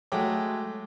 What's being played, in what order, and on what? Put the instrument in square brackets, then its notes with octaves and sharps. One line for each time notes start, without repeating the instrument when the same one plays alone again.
[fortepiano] F#3 G#3 A3 G5 D6